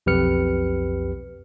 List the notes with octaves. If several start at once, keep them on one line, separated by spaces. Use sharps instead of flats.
B1 F2 G4 B4 F6 C#7